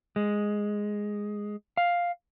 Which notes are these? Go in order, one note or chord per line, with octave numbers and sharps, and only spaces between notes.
G#3
F5